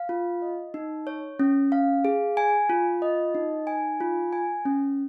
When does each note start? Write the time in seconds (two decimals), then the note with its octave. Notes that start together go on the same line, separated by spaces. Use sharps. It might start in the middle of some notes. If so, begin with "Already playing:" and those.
Already playing: F5
0.09 F4
0.42 D#5
0.74 D#4
1.07 C#5
1.39 C#4
1.72 F5
2.05 G#4
2.37 G#5
2.70 F4
3.02 D#5
3.35 D#4
3.67 G#5
4.00 F4
4.33 G#5
4.65 C#4